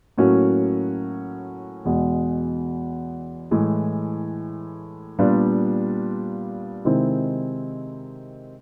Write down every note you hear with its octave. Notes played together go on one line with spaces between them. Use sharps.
A2 F#3 A#3 C#4 F#4
E2 B2 G#3
A2 E3 G#3
A#2 G3 B3 D4 F4
C3 D#3 G#3 C4 E4